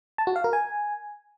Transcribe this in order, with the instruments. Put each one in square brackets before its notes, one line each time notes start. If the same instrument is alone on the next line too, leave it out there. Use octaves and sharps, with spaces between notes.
[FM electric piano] A5
F#4
F5
A#4
G#5